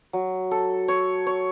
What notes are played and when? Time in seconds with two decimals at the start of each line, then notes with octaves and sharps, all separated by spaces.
0.13 F#3
0.51 A4
0.88 C#5
1.26 C#5